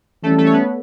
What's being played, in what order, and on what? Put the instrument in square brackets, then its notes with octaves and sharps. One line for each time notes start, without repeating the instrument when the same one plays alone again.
[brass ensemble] E3 G3 C#4 [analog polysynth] A3 A4
[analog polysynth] A3 A4
C#5
B3 B4